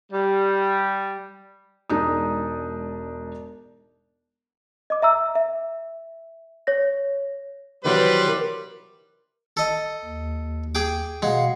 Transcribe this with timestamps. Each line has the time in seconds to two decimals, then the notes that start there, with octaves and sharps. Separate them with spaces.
0.12 G3
1.90 E1 G#3 D4 D#4 D#6
4.90 D#5 D6
5.02 E5 A#5 E6
5.35 E5
6.67 C#5 A#6
7.84 D#3 E3 F#3 G3 B4 C5
8.28 A#4
9.57 A4 D#5
10.05 D#2
10.75 G#4 G5 D6
11.22 B2 G#3 F5 F#5